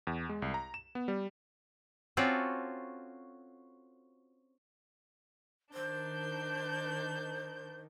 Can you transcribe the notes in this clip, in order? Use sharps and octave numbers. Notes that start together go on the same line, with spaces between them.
E2
G#3
C2
A#5
E7
B3
G3
C4 C#4 F4 F#4 A4 D5
D#3 D4 C5 G6